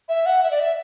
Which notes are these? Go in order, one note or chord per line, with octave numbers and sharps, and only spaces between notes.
E5
F#5
E5
D5
E5